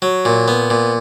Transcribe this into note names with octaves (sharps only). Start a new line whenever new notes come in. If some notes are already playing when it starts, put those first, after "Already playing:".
F#3
A#2
B3
A#2